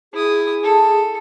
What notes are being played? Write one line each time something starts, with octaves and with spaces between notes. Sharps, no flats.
E4 G#4 D#6
A4